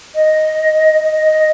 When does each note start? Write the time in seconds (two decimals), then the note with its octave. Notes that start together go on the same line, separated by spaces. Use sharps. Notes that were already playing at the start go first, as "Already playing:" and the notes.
0.15 D#5
1.01 D#5
1.22 D#5